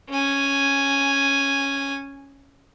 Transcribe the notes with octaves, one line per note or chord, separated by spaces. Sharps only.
C#4 G#5